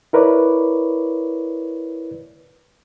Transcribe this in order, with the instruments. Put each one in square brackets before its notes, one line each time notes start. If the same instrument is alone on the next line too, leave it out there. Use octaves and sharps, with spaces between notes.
[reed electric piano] E4 A#4 B4 C#5 D5